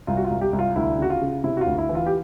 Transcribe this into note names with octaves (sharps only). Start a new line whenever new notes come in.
C2 F4
F#4
F4
C2
G4
C2
F4
D2 E4
C#3 F#4
F4
C#3
C3 E4
F#4
F4
D2
E4
E3
F4
G4